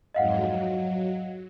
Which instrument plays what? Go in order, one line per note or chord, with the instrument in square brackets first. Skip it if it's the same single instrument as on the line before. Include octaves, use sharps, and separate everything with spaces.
[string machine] F2 G#2 F#3 [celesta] D#5 F5 F#5
[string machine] F#3